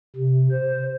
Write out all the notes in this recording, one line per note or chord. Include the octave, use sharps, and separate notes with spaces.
C3
C5